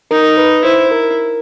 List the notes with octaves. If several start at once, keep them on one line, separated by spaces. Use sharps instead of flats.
D#4 A#4
B4
E4 C5
A#4